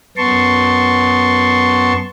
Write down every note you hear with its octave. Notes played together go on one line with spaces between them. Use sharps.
F#2 B3 A5 C6 C#6